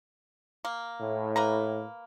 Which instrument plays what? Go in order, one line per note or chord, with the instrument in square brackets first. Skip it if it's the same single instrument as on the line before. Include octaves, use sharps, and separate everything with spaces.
[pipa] A#3
[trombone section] A2
[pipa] A#3 B4 A#5